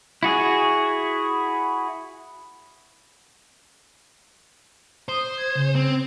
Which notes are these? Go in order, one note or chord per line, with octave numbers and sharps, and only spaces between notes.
E4 F#4 G#4
C5 D#6
G#6
C#3
C4